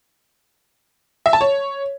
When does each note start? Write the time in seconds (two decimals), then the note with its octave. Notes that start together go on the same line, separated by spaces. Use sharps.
1.26 E5
1.33 A5
1.41 C#5